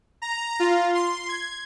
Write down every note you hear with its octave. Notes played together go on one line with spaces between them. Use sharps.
A#5
F4
C6
G#6